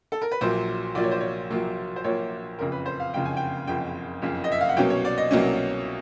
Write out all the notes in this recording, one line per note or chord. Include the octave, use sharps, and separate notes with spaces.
A4
A#4
B4
A#1 A#2 F#3 A#3 C5
A#1 A#2 F#3 A#3 D5
C#5
C5
C#5
A#1 A#2 F#3 A#3
C5
A#1 A#2 F#3 A#3 C#5
F#1 F2 C#3 A#4
B4
C5
F5
F#1 F2 C#3 G5
G#5
G5
F#1 F2 C#3 G5
F#1 F2 C#3
D#5
E5
F5
F#5
C2 B2 F#3 A#3 C#4 G5
C#5
D5
D#5
C2 B2 F#3 A#3 C#4